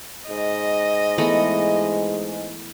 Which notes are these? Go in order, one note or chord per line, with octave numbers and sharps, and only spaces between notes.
G#2 D#5
E3 G#3 A3 B3